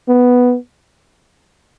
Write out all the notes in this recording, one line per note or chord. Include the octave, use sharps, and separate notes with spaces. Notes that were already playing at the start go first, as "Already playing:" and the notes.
B3